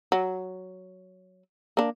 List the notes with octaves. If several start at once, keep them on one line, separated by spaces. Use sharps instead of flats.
F#3
A#3 D4